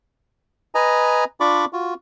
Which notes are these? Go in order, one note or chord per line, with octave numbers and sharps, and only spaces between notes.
B4 D#5 G#5 A#5
D4 F4 D5 B5 C#6 D6
F4 F#4